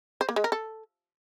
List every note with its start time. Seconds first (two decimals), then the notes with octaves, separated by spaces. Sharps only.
0.21 C5
0.29 A#3
0.36 G#3
0.44 A#4
0.52 A4